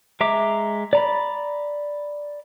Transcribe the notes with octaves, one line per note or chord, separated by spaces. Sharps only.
G#3 E5 A#5 D6
D5 A#5 B5